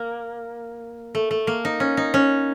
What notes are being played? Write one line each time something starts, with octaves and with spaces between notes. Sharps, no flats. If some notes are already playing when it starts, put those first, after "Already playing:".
Already playing: A#3
A3
A3
A#3
D#4
C#4
D#4
C#4